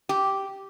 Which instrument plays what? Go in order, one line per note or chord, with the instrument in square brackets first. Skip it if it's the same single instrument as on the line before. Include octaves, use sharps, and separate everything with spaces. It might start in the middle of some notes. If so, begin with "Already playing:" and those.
[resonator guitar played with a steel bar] G4